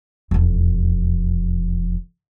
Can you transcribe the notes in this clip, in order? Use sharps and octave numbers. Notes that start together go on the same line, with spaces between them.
E1 F2